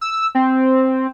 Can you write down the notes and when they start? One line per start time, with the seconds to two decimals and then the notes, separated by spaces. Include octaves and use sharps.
0.01 E6
0.35 C4